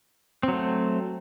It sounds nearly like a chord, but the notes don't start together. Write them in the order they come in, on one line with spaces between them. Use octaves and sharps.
C4 F#3 A3